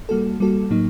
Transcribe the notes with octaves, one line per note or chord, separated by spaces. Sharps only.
G3 A#3 F#4 A4
G3 A#3 F#4 A4
A2 F#3 A#3 D#4